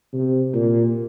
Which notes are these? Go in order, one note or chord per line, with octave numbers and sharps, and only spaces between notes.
C3
A#2